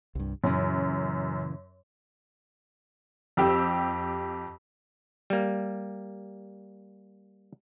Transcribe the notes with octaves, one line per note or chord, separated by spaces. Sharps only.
C2 G2
F#2 A#2 C#3 E3
F2 G4 E6
G3 A#3